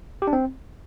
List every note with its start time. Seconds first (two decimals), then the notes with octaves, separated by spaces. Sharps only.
0.22 G4
0.27 D4
0.33 C4